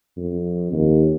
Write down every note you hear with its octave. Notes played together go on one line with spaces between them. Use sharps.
F2
D#2